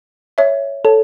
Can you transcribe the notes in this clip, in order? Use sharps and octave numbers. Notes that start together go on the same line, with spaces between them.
C#5 E5
A4 C#5